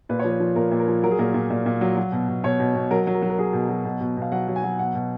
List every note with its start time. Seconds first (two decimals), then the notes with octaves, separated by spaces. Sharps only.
0.09 A#2 B4
0.19 F3 C#5
0.31 B4
0.40 F3
0.56 A#2 A#4
0.71 A#2
0.80 A#4
0.88 F3
1.03 F#3 A#4
1.11 G#4
1.19 A#2 A#4
1.34 A#2
1.50 A#2
1.66 A#2
1.81 F#3
1.97 F#3
2.12 B2
2.29 B2
2.43 B2 C#5
2.60 B2
2.75 B2
2.91 F#3 A#4
3.07 F#3
3.14 A#4
3.22 F#3
3.30 A#4
3.39 F#3 G#4
3.53 B2
3.69 F#3
3.85 B2
4.01 B2
4.17 B2 F5
4.32 F#3 F#5
4.48 F#3
4.56 G#5
4.64 F#3
4.79 B2 F#5
4.95 B2